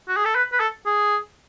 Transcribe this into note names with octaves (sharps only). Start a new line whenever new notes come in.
F#4
G#4
A4
B4
B4
A4
G#4